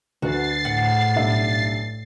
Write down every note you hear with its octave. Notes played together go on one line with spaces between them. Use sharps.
D2 D3 F#4 B4 A6 C7
A2 F#5
B1 G2 E5